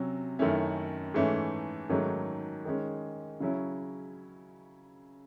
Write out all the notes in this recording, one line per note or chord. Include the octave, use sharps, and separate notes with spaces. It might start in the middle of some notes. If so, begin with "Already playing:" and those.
Already playing: C3 F#3 C#4
F#2 D#3 A3 C#4 E4
G#2 E3 A3 C#4 E4
G#2 D#3 F#3 A3 C#4
D#3 G#3 C#4
C#3 F#3 C#4 E4